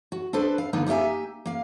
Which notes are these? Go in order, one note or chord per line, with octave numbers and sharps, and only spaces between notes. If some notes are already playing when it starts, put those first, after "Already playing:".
F#4
D4 A4 B4 C5
F5
D3 A#3 B3 D#4 B4
A#3 D#4 G4 E5 G#5
A#3 F5